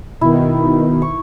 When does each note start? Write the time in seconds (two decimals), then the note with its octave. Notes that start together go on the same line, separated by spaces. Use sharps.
0.21 B2 D#3 E4
1.02 C#6